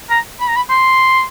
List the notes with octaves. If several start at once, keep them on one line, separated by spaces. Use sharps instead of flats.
A#5
B5
A#5
B5
C6